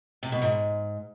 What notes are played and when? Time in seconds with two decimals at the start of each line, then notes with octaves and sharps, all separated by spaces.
0.23 C3
0.32 B2
0.42 G#2